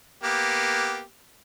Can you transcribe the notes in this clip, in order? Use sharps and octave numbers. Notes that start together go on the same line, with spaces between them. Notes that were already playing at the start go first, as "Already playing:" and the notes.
A#3 B3 G4